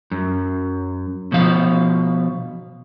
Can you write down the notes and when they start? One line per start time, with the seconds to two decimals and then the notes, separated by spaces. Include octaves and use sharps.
0.11 F#2
1.32 B2 F3 F5